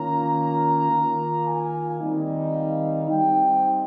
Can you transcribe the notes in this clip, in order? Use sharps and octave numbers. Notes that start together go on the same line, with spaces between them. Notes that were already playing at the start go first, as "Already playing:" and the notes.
Already playing: D#3 A#3 C#4 F4 A#5
D#3 A#3 F4
G#5
D#3 G3 C4 D#4
F5
G3 C4 D#4 G5